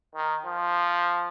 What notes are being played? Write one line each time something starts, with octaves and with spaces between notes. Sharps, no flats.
D#3
F3